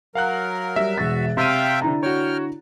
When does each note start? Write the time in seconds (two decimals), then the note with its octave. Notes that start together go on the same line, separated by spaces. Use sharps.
0.15 F#3 A#4 F5 F#5 F#6
0.76 G3 E5
0.98 E1 F#4 A6
1.37 C3 E5 F5 G5 C6 F6 D#7
1.82 D3 E4 A#5
2.03 F#4 C#5 G5 F6